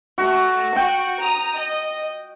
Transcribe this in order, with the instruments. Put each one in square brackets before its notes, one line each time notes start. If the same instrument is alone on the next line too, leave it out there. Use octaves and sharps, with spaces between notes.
[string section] A3 [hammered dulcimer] F#4
[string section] F#4 [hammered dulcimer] G5
[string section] A#5 D#6
D#5